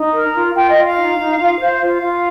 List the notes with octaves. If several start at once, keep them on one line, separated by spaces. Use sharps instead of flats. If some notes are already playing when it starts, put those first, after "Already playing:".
Already playing: D#4
A#4
F4
F4 G5
D#5
F4
F5
D#4
D#4
F4
C5
F4 F5
F4